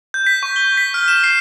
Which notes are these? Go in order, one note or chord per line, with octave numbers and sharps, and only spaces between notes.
G6
B6
C#6
G7
B6
F6
E7
C7